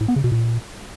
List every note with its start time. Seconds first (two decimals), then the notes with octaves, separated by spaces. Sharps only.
0.01 A2
0.08 B3
0.16 C#3
0.24 B2
0.32 A#2